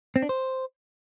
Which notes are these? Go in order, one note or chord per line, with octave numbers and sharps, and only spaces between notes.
C4
D4
C5